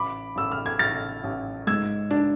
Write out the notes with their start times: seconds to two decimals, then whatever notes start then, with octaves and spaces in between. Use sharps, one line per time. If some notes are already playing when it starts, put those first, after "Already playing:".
Already playing: A1 B5 D6
0.36 A1 E6
0.52 F6
0.66 G#6
0.79 A1 F6 A6
1.24 A1
1.67 G#2 E6 G#6
2.11 D4